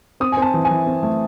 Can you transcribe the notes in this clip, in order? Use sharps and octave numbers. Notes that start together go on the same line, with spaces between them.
C4 D#6
C4 G#5
A5
E3
G#5
E3
C4
A3